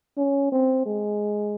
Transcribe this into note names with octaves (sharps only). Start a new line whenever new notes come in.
C#4
C4
G#3